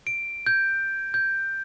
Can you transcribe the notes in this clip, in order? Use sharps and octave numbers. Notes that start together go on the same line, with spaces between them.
D7
G6
G6